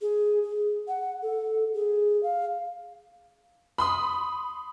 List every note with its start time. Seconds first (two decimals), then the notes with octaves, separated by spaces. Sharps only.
0.01 G#4
0.43 G#4
0.88 F#5
1.22 A4
1.74 G#4
2.23 F5
3.78 B5 C6 D#6